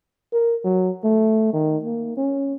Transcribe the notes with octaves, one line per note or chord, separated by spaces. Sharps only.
A#4
F#3
A3
D#3
A#3
C#4